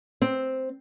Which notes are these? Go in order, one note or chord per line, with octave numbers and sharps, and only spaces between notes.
C4